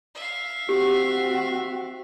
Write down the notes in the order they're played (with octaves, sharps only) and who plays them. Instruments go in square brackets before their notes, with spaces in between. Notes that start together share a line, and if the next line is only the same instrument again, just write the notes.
[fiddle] E5 F5
[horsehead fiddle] C4 F#4 [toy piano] G4